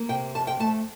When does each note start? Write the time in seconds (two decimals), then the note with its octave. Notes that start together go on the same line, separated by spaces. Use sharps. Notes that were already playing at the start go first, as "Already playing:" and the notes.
Already playing: A#3
0.09 C3 G5
0.35 F2 A5
0.47 G5
0.59 A3 A5